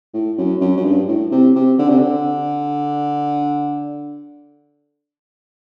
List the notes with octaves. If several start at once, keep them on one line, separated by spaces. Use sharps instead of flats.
A2
F#2
F#2
F#2
G2
A2
C3
C3
D3
C3
D3